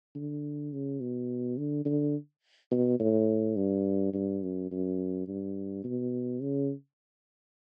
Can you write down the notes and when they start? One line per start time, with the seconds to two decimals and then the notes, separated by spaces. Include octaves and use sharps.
0.15 D3
0.73 C#3
1.01 B2
1.58 D3
1.85 D3
2.71 B2
3.00 A2
3.56 G2
4.14 G2
4.42 F#2
4.71 F#2
5.28 G2
5.84 B2
6.42 C#3